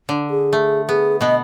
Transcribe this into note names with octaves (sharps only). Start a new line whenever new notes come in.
D3
G#4
A3
B3 G#4
B2 B3 D#5